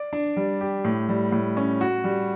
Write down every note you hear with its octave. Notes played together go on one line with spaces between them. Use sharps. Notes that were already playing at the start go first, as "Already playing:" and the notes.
Already playing: D5
D4
G3
G4
A2
G3
A2
C#4
F#4
G3